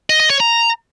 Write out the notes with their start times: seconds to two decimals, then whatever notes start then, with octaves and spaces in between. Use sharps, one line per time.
0.10 D#5
0.20 D#5
0.30 C#5
0.40 A#5